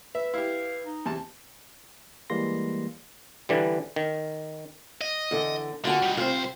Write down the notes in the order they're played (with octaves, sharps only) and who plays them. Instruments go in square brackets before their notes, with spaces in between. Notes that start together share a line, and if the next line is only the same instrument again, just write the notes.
[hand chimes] B4 [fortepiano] E5
[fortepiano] E4 G4 [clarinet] F5
[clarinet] D#4
[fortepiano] E2 C3 A5
[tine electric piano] E3 G3 G#3 A#3 C6 A#6
[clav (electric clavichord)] D3 E3 G3
D#3
[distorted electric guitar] D#5
[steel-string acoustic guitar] E2 D3
[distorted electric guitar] D3 [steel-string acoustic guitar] F4 F#4 G#5
[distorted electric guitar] G3 D#4
[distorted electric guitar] C2 C5 [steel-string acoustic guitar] C4 F4